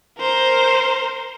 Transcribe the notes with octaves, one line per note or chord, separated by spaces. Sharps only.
A#4 C5